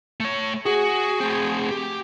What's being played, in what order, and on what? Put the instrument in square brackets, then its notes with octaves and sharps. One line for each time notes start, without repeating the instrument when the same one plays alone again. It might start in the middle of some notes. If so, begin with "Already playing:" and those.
[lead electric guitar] A3 C#5
[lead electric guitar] F#4 [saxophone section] G#4
[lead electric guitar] A3 C4
G4